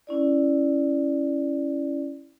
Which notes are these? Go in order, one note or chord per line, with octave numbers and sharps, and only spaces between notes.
C#4 E4 D5